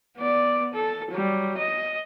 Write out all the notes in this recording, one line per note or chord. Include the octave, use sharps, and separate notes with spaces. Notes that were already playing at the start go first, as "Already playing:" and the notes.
B3 D5
A4
F#3 G3
D#5